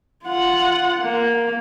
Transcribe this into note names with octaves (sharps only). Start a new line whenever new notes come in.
F4 F#5
A#3